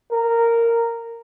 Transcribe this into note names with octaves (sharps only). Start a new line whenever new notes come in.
A#4